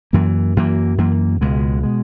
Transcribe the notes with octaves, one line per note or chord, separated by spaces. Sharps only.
F#2 E3 A#3
F#2 E3 A#3
F#2 E3 A#3
C#2 B2 G#3
B2 G#3